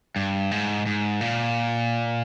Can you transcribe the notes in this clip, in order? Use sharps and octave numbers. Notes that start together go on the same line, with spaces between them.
G2
G#2
G#2
A#2